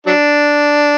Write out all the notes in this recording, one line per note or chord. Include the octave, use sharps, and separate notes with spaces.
F#3 D4